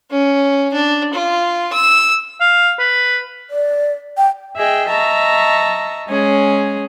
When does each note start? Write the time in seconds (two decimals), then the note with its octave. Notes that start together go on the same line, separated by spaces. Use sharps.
0.10 C#4
0.73 D4
1.14 F4
1.73 E6
2.41 F5
2.79 B4
3.50 D5
4.17 G5
4.58 G#4 D#5 E5 G5
4.88 D#5 E5 A5 A#5 C#6
6.09 G#3 C#4 G#4